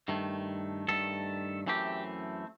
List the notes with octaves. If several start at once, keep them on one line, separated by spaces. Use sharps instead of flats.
G2 D#3 A3
G2 D#3 A3 A4
F#2 E3 A3 C4 G4